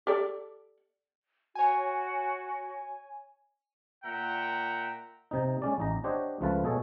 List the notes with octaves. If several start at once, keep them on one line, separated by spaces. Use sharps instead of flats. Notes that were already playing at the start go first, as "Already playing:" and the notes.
G4 A4 D5
F#4 C#5 G#5
A#2 E5 F#5 G5 A#5
C3 D#4
G#3 C#4 D5
A1 D#4 A#5
D4 G4 C5 C#5 D#5 F#5
C#2 F3 A3 F4 B4 A5
B2 G#4 A4 C#5